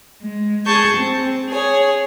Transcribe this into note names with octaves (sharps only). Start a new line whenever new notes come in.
G#3
G#4 A5 C#6 G6
C4
G#4 C#5